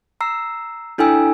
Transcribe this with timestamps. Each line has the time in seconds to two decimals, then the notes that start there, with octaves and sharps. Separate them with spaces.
0.21 A#5 E6 C7
0.98 D4 E4 A4 G5 G#5 E6